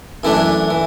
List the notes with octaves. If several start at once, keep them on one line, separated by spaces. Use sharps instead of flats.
F#2 E3 A3 D4 E4
E3